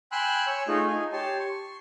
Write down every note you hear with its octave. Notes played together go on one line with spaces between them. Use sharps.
G5 G#5 B5 C6 E6 F#6
C#5 G#5 E6
A3 D#4 F4 G#4
D#4 G#5
G4 C#5 A5 C6
C6 C#6